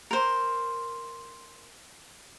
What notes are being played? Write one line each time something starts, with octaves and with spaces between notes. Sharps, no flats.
A#4 C5